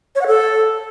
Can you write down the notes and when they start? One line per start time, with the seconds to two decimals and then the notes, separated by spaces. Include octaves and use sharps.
0.15 C#5
0.21 F#5
0.27 A4